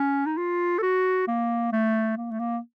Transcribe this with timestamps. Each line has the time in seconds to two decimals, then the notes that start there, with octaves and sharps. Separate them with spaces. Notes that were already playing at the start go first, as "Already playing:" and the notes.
Already playing: C#4
0.26 D#4
0.37 F4
0.79 A4
0.82 F#4
1.28 A#3
1.73 A3
2.17 A#3
2.31 A3
2.40 A#3